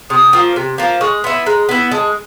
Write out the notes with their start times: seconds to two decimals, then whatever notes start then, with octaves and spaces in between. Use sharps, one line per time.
0.10 C3 D#6
0.33 F3 A#3
0.56 C3
0.78 F3 A#3
1.01 G#3 C#6
1.24 B3 E4 C6
1.46 G#3 A#5
1.69 B3 E4
1.92 G#3 A5